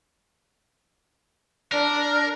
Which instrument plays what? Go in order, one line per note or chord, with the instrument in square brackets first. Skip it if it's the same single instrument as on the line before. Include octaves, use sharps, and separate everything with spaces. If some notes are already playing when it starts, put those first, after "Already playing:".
[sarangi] D4 [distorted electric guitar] A#4